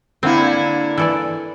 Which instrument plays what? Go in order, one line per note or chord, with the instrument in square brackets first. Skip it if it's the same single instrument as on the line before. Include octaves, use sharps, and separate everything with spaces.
[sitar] D3 A#3 E4 [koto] C4
[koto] E3 A4 D5